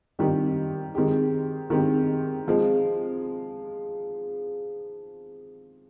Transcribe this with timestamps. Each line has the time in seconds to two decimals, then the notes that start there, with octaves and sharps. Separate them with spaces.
0.19 D#3 G3 C4 G4
0.95 D#3 G#3 C4 G4
1.70 D#3 G#3 C4 G4
2.46 C3 F3 G#3